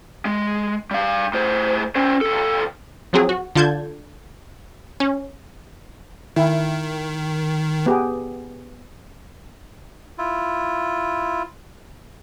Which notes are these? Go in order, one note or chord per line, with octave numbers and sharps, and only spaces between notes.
G#3
G3 F5
A2 C5
C#4 C5
E2 A4
F3 F#3 C4 G#4
F#4
D3 F4 A5 G6 G#6
C#4
D#3 E4
B3 G4 G#4
E4 F4